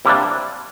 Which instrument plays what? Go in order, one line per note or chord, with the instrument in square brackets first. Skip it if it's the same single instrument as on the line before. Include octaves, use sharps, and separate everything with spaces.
[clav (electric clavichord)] C3 G3 A#3 D4 E4